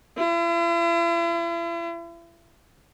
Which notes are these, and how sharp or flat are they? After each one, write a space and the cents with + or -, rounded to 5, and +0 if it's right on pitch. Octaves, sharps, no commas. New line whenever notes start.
E4 +45